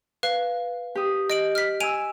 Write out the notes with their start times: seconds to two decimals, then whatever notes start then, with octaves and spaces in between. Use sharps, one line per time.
0.23 B4 F5
0.95 G4 D#6
1.30 D#5 D7 F#7
1.55 F6 B6
1.80 G#5 E6 D7 D#7 F7